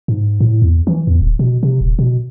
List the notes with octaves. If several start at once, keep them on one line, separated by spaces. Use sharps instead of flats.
G#2
A2
E2
E3
E2
D1
B2
C3
D#1
B2